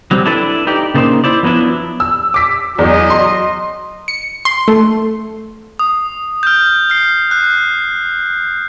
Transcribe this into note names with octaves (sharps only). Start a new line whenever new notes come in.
F#3 G3 C4
D4 E4 A4 B4
D#4 G4 D5
C#3 A3 A#3 D#4 C5
E4 C5 D5
F3 F#3 B3 D4 E4
E6
D6 B6
E2 F#3 D#5
C6
C#7
C6
A3
D#6
F6 G6
F6 C7
F#6